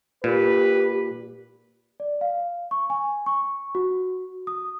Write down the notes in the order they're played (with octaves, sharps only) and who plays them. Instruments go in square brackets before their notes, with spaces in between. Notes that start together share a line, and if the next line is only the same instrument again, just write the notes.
[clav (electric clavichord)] A#2 [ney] G4 [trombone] B4
[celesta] D5
F5
C#6
G#5
C#6
F#4
D#6